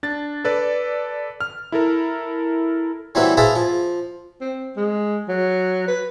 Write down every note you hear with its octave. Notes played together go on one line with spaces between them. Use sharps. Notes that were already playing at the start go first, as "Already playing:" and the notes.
D4 A6
A4 B4 D5
F6
E4 A4 A#4
E3 F#3 G3 C4 E4 B4
G#4 B4 C5 E5 F5 A5
F3
C4
G#3
F#3
B4